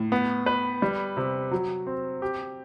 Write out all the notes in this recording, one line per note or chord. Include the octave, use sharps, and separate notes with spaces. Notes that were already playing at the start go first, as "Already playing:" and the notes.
Already playing: A2
B3
B4
G3
C3
F#3
C4
G4